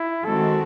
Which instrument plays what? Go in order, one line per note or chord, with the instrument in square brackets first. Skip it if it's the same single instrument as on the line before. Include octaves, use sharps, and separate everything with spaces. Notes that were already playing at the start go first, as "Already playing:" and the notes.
Already playing: [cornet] E4
[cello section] D#3 G#3 C4 F#4 [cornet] A4